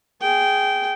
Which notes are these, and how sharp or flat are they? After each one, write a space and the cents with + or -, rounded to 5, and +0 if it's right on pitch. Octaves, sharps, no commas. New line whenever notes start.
G#4 +0 G5 -15